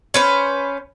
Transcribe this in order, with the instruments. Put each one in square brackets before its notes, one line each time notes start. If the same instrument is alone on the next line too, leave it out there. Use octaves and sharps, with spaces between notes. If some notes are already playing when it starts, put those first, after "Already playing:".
[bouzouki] C#4 B4 C5